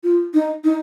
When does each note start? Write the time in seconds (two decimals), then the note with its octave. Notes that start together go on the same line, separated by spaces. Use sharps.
0.04 F4
0.34 D#4
0.64 D#4